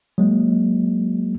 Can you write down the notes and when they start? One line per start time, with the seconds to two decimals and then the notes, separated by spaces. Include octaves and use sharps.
0.18 F#3 G#3 A#3